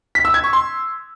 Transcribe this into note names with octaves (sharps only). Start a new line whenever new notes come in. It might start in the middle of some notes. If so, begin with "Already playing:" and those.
B6
E6
G#6
C#6
C6